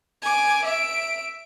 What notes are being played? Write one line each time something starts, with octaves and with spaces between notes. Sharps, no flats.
G#5 D6
E5 D7